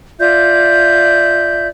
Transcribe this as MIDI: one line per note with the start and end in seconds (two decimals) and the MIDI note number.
0.20 1.68 65
0.20 1.68 74
0.20 1.68 76
0.20 1.68 91